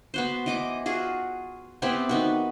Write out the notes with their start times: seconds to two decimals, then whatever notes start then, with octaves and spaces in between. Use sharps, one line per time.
0.14 B3 F#4 C5
0.46 E3 D#5 D6
0.86 F4 F#4 G#4
1.82 B3 C4 E4 G4
2.09 D#3 B3 F#4